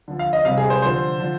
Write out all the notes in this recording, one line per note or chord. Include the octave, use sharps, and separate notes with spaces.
D3 F3
F5
D#5
C3 G3 F5
G#4
C5
D3 F3 C5
D3 F3